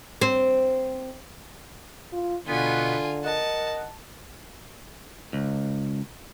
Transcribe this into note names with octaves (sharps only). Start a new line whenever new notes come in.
C4
F4
B2 D3 B3 F4 G#5
A#4 D#5 F#5 A5
C#2